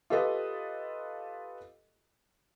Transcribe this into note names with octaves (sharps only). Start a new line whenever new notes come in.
F4 G4 A4 B4 D#5